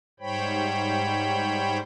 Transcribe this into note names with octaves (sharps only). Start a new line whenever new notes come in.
G#2 G3 C5 C#5 G5 B5